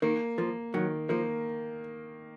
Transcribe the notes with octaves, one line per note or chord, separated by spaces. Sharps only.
D#3 A#3
F3 A#3
D#3 F#3
F3 A#3